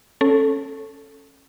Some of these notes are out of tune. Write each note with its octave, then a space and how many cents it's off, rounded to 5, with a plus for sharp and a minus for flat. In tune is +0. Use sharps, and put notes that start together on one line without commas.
C#4 -20 A4 +0